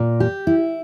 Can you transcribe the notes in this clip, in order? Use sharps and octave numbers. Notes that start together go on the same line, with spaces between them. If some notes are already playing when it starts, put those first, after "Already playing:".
Already playing: A#2
G4
E4